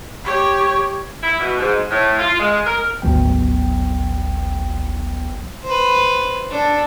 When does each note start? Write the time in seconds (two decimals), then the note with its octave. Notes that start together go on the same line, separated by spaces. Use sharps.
0.24 G4 C#5
1.22 E4
1.40 B2
1.59 G#2
1.91 A2
2.19 F4
2.39 G#3
2.66 A#4
3.02 G#1 D2 F#3 B3 G5
5.64 B4 C5
6.50 D4 A4